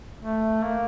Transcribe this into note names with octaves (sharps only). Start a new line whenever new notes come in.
A3
A#3